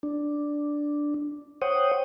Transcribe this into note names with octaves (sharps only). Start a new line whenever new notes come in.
D4
C5 C#5 F#5 G5 D#6